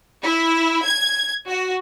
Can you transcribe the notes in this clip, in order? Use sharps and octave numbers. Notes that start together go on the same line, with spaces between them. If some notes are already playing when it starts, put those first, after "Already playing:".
E4
G#6
F#4